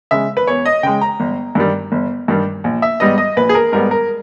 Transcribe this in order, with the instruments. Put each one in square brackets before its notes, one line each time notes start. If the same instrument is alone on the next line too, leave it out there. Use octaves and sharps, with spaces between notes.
[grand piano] C#3 G#3 E5
B4
E2 C#5
D#5
C#3 G#3 G5
A#5
G1
G2 D#3 G3
G1
G2 D#3 G3
A#1
E5
G#2 G3 B3 D#5
D#5
A#1 B4
G#4
A#4
G#2 G3 B3 A#4
A#4